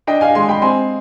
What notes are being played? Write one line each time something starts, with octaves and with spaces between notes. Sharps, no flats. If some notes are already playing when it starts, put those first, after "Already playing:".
D4 D#5 G5
F5 G#5
G#3 G#5 C6
G5 B5
C4 G#5 C6